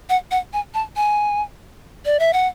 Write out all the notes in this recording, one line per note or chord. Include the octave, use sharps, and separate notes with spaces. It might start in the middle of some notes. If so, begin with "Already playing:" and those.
F#5
F#5
G#5
A5
G#5
D5
E5
F#5